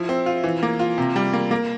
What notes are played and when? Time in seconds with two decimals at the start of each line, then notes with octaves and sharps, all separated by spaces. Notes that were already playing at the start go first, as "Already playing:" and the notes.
Already playing: F3 E4
0.09 C4
0.26 F4
0.44 E3
0.63 A#3
0.79 F4
0.98 C3
1.16 G3
1.33 A#3
1.51 A#3